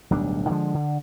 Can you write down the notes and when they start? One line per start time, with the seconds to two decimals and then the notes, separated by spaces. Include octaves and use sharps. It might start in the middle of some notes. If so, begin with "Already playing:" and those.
0.10 D1 B1 G3 D4
0.49 D3 F3 G#3
0.74 D3